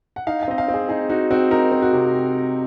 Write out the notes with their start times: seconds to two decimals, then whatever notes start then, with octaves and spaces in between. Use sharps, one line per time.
0.16 F#5
0.27 D#4 F5
0.43 F5
0.48 C4 D#5
0.58 F5
0.68 C4
0.74 G#4
0.89 D#4 G#4
1.09 D#4 F#4
1.31 C4 F#4
1.51 D#4 A#4
1.72 C4
1.82 F#4
1.93 C3